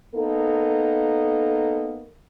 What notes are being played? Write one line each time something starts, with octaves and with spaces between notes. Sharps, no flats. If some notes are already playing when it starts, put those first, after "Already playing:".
A#3 B3 D#4 A4